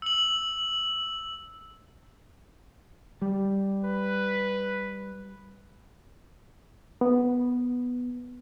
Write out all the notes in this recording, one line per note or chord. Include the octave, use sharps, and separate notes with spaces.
E6 F#7
G3
B4
B3